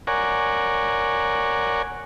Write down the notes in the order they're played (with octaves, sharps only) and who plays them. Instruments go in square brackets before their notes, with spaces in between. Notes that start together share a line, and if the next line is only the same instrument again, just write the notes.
[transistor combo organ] A#4 C#5 D5 F#5 G#5